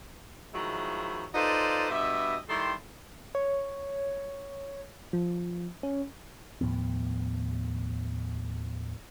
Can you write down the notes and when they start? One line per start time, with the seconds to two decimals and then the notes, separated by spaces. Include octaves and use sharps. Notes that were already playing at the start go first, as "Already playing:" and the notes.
0.54 D#3 F3 F#3 G#3 E4
1.35 D#4 F4 A4 B4 C5 D5
1.90 G2 B2 D#5 E5
2.49 D#3 G3 E4 A4 C6
3.35 C#5
5.13 F3
5.83 C#4
6.61 D#2 A2 F3 B3